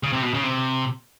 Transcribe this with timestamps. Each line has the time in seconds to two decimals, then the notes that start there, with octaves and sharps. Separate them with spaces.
0.03 C#3
0.13 C3
0.23 B2
0.34 C#3
0.43 C3